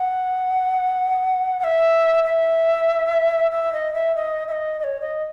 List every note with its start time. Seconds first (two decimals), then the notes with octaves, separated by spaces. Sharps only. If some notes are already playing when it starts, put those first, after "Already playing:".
Already playing: F#5
1.59 F#5
1.64 E5
2.23 E5
3.51 E5
3.72 D#5
3.93 E5
4.15 D#5
4.47 E5
4.51 D#5
4.79 D#5
4.84 C#5
5.00 D#5